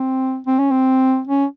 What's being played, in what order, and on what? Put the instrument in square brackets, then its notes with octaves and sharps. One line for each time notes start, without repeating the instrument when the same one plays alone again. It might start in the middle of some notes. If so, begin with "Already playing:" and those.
Already playing: [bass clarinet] C4
C4
C#4
C4
C#4